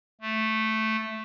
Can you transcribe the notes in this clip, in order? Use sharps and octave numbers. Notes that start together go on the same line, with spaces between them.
A3